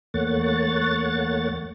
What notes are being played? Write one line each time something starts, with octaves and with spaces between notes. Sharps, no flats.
E2 A3 A#3 C#5 F#5 A6